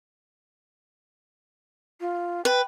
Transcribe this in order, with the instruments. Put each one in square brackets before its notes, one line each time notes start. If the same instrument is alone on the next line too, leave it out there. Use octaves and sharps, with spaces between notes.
[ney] F4
[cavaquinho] B4 [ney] G5